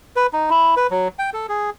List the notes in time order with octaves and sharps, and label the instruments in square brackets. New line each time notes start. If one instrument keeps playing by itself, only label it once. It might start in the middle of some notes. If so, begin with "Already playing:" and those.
[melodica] B4
D#4
E4
B4
F#3
G5
A4
G#4